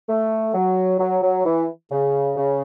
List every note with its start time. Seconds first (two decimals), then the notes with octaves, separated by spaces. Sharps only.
0.09 A3
0.54 F#3
0.99 F#3
1.22 F#3
1.46 E3
1.91 C#3
2.36 C#3